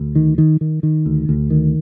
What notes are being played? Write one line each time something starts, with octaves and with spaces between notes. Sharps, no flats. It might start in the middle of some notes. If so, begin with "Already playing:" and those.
Already playing: D2
D#3
D#3
D#3
D#3
D2
D2
D#3